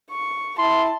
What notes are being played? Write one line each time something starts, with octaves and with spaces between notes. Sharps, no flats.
C#6
E4 A5 C6